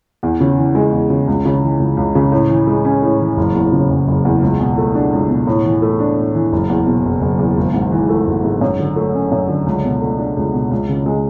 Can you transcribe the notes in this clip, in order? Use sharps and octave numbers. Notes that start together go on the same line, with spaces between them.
E2
C#3
E3
G#3
E2
C#3
C#2
C#3
E3
C#2
C#2
C#3
A2
E3
G#3
C#4
A2
E3
F#1
E2
C#3
F#1
F#1
E2
C#2
B2
A3
D4
C#2
B2
A2
E3
A3
D4
A2
E3
F#1
E2
B2
F#1
F#1
E2
G#1
G#2
E3
A3
G#1
G#2
F#2
D3
A3
C#4
F#2
D3
C#2
B2
A3
D4
C#2
B2
C#2
C#3
G#3